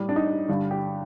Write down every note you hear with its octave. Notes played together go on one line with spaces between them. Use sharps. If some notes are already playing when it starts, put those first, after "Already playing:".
Already playing: A2 G3
D4
D#4
G2 D3 G3
G4